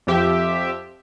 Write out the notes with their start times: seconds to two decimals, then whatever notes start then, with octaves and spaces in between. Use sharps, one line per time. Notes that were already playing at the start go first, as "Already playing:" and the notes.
0.07 F2 F3 G4 E5